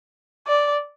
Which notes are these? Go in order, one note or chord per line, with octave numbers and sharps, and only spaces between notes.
D5